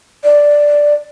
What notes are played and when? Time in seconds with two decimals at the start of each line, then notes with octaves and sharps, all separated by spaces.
0.24 D5